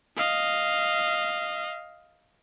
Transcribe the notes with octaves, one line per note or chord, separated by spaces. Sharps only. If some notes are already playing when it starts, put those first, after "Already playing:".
D#5 F5